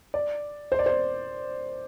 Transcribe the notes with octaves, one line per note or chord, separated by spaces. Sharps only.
D5
C5
D5
C5